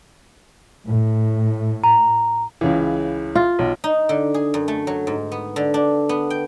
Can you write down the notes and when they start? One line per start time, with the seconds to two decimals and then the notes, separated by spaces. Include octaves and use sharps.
0.86 A2
1.84 A#5
2.61 C#2 C#3 E3
3.35 F4
3.59 B1
3.84 D#4
4.09 D3
4.34 G#4
4.54 F#2
4.68 A3
4.87 F#3
5.07 G#2
5.32 B3
5.56 D3
5.74 D4
6.09 B3
6.30 G5